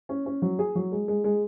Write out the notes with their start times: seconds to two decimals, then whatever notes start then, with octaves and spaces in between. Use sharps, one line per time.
0.09 C#4
0.26 C#4
0.42 F#3
0.59 G#4
0.75 F#3
0.92 G#3
1.08 G#3
1.24 G#3